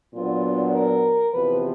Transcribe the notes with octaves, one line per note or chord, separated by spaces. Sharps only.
A#2 F#3 B3 D4 F4
A#4
E2 C3 F3 B4